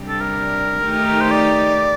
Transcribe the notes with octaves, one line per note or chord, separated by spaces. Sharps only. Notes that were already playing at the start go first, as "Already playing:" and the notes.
Already playing: C3 G3 D4 G4
A4
A#4
D#3 A3 D#4 G4
C5
D5